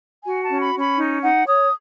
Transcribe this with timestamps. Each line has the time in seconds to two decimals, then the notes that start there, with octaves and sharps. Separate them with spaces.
0.24 F#4 G#5
0.42 A5
0.49 C#4
0.62 B5
0.73 C#4
0.80 B5
0.98 D#4
1.22 D#4 F#5
1.47 C#5 D#6